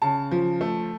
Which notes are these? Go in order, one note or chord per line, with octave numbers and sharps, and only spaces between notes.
C#3 A5
F3
A3